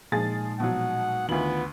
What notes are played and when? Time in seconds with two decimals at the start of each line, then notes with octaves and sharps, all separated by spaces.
0.12 A#2 F3 G#3 D#4 G#4 A6
0.60 B2 F3 F#3 F#5
1.29 D2 D#3 B3 F4 F#7